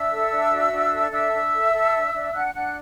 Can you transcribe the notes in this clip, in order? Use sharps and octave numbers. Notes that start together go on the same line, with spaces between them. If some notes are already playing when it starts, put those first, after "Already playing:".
Already playing: D4 E5 E6
A4
D4
F#4
D4
A4
D4 E5 E6
D4
A4
A4
D4
D4
D4 F#5 F#6
D4 F#5 F#6